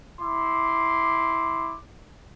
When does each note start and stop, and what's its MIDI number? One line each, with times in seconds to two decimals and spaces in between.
0.21 1.76 64
0.21 1.76 84
0.21 1.76 86